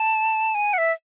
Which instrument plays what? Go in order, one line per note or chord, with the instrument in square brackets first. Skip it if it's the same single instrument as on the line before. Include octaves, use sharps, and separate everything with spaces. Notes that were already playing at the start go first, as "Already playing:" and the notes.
Already playing: [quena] A5
G#5
F#5
E5